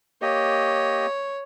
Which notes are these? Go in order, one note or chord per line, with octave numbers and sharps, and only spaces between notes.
A#3 G4 C#5 D#5